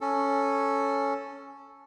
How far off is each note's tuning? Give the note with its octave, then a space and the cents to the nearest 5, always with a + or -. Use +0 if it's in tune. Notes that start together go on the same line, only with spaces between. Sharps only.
C#4 +0 A4 +0